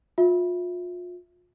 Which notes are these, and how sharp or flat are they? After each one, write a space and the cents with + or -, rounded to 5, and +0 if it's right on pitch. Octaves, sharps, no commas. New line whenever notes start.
F4 +35 E5 +0